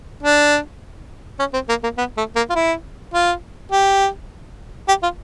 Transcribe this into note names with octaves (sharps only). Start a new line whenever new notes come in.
D4
C#4
C4
A#3
A#3
B3
A3
A#3
F4
E4
F4
G4
G4
F4